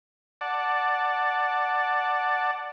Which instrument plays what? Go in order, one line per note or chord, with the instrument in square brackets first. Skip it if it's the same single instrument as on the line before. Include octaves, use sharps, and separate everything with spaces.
[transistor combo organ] D5 F#5 A5